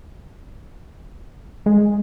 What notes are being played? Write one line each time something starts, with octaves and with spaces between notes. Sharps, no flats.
G#3